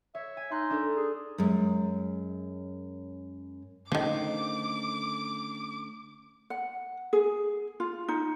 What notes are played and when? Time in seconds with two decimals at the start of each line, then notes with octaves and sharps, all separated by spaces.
0.15 C#5 E5
0.37 G#5
0.51 D#4 C6 F#6
0.70 D4 A4 A#4
0.96 G#4
1.38 F#2 G#3
3.92 D3 D#3 F3 A3 C#4 D6
6.50 F#5
7.13 G#4
7.80 F4
8.08 D#4